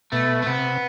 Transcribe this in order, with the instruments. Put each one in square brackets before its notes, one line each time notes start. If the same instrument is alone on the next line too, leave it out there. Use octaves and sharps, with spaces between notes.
[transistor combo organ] B2 [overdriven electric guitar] A3
[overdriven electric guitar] A3
[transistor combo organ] C3 [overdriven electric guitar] B3